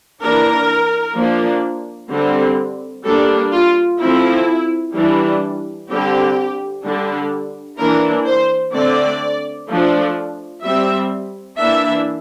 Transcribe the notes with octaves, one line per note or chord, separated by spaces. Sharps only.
E3 A#3 D4 A#4
F3 A#3 D4
D3 G3 C4
G3 A#3 D4 A4
F4
F3 A3 C4 E4
E3 G3 D4
D3 G3 C4 G4
D3 G3 D4
E3 A#3 D4 A#4
C5
D3 A3 C4 D5
F3 A3 D4
G3 C4 E5
E3 A#3 D4 E5